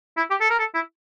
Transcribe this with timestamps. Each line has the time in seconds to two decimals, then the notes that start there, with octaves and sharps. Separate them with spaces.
0.17 E4
0.30 G4
0.41 A4
0.50 A#4
0.59 A4
0.74 E4